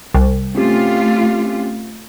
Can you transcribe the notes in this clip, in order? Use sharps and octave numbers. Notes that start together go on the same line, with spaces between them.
C2
A3 C4 C#4 F4 G4